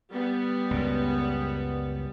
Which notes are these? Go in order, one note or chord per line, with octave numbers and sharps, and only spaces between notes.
G3 B3
C#2 F#2 A#2